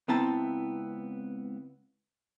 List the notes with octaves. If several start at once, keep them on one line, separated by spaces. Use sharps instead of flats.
C#2 B3 C4 E4 A5 A#5